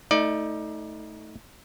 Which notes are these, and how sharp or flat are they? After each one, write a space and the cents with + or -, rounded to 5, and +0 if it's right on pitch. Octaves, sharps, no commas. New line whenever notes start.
A3 +0 D#4 +25 D5 +20